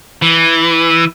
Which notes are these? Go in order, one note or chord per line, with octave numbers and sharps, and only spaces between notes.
E3